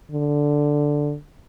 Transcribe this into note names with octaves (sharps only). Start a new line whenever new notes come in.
D3